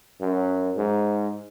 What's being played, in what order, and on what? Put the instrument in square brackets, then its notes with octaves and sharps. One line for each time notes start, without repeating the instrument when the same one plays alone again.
[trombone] F#2
G#2